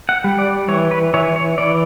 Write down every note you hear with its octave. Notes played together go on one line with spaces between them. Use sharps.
F#5
G3
D5
E3 C#5
B4
E3 C#5
C#5
E3 D5